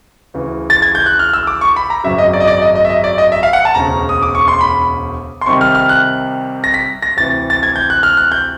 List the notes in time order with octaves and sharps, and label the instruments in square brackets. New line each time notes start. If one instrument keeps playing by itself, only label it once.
[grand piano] D2 C#3 E3
A6
G#6
G6
F#6
F6
E6
D6
C#6
B5
A#5
G#1 F#2 C#3 F#3 E5
D#5
D5
D#5
D5
D#5
D#5
E5
D#5
D5
D#5
E5
F5
F#5
A5
E1 D2 C#3 A#5
D#6
D6
C#6
C6
B5
C6
C2 C3 D#3 G3 C#6
F6
F6
F#6
A#6
B6
A#6
D2 C3 E3 A6
A6
G#6
G6
F#6
F6
F#6
G6